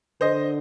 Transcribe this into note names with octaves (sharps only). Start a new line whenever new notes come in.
D3 C5 D#5